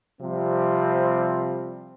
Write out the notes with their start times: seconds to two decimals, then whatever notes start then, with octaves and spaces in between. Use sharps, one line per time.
0.21 C3 F3 G3 C4